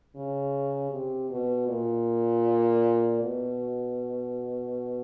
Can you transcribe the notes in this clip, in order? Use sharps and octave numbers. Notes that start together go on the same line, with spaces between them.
C#3
C3
B2
A#2
B2